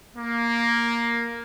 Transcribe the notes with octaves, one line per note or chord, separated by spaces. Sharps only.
A#3